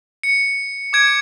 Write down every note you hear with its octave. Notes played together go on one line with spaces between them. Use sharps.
C#7
D6 G#6 D7